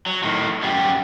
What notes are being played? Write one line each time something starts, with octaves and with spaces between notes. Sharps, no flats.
F#3
A2 D#3
F#2 G3